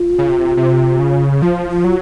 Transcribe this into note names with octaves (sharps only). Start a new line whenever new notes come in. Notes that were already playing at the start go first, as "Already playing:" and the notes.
Already playing: F4
C#3
C3
C3
C#3
F3 F4
F4
F#3